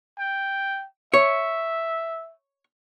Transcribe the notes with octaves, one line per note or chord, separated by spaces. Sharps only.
G5
C#5 E5